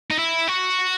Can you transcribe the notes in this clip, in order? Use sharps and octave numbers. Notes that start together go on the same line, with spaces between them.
D#4
E4
F#4